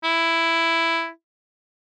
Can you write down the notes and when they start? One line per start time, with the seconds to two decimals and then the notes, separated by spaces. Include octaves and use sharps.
0.04 E4